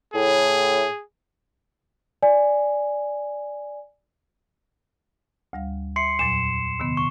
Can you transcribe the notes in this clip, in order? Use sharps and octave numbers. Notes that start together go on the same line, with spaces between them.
A2 G#4
D5 G#5
D2 G3 F5
E5 C6 C7 C#7
E2 A#2 F#3 E7
C3 D#3 B3
C#6